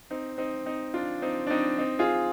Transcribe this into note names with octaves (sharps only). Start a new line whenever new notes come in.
C4 D#4
C4 D#4
C4 D#4
D4 F4
C4 D#4
D4
C4 D#4
C4 D#4
F4 G#4